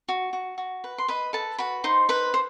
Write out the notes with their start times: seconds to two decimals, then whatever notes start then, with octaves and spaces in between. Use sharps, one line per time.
0.09 F#4
0.33 F#4
0.58 F#4
0.84 B4
0.98 C6
1.08 B4 D#5 B5
1.33 A4 B4 A5
1.58 F#4 B4 B5
1.84 D#4 C5 C6
2.09 B4 C5 B5
2.34 C5